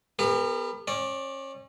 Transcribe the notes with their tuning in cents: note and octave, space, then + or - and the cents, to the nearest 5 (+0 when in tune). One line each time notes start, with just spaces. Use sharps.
B3 +0 G4 +45 A#4 -30
C#4 -35 D5 +0